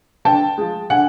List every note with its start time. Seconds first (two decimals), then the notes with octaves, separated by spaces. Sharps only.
0.25 D3 G5 A5
0.58 F3 G#3
0.90 D3 F#5 G#5